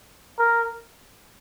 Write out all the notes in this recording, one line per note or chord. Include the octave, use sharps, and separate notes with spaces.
A#4